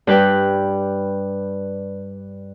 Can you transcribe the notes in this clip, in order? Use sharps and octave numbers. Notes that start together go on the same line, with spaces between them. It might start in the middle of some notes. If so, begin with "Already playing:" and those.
G2 B4 G5